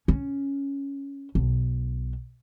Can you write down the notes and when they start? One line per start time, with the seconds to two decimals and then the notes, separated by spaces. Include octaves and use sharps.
0.08 C#4
1.35 B1